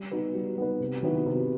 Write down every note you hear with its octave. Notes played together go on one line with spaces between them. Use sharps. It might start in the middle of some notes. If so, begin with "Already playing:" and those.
Already playing: G3
B3 D#4 F#4 B4
G3
B3 D#4 F#4 B4
C3
D#3 F#3 B3 E4
C3